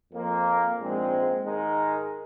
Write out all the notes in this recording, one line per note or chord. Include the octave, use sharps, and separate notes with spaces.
F2 F3 A#3
A#1 G#2 G#3 C4
G#2 D#3 G#3 D#4 A#4